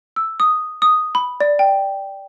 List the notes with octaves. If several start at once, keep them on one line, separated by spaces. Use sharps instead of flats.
E6
D#6
D#6
B5
D5
G5